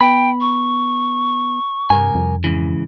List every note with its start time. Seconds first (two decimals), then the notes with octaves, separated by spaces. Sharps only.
0.01 B3 G5 B5
0.41 C#6
1.90 C2 G2 A#4 G#5
2.15 F2
2.44 G#2 C#3 E3